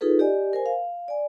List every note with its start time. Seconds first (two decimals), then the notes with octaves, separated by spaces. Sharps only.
0.01 D#4 F4 G#4 A4 B4
0.19 G4 D5 D#5 G#5
0.53 A#4 C5 G#5
0.66 F5
1.08 D5 G#5